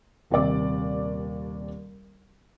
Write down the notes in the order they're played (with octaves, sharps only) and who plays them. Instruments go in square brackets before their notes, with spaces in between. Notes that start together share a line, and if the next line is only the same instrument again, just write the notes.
[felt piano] D#1 D#2 C3 D5 D6